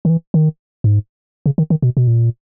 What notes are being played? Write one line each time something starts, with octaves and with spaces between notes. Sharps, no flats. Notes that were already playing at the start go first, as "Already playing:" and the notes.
D#3
E3
D#3
G#2
C#3
D#3
D#3
B2
B2
A#2